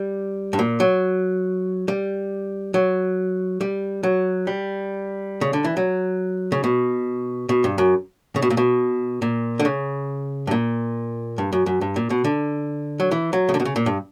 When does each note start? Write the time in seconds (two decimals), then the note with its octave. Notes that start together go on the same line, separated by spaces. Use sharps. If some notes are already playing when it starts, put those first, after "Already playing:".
Already playing: G3
0.53 G2
0.59 A#2
0.80 F#3
1.88 G3
2.74 F#3
3.61 G3
4.03 F#3
4.47 G3
5.41 C#3
5.53 D3
5.64 E3
5.77 F#3
6.52 C#3
6.64 B2
7.49 B2
7.64 G2
7.78 F#2
8.36 C#3
8.42 B2
8.50 A#2
8.57 B2
9.22 A#2
9.59 D3
9.65 C#3
10.47 G2
10.51 A#2
11.38 G2
11.52 F#2
11.66 F#2
11.81 G2
11.96 A#2
12.10 B2
12.25 D3
13.00 F#3
13.11 E3
13.33 F#3
13.49 C#3
13.54 D3
13.60 B2
13.65 C#3
13.76 A#2
13.86 G2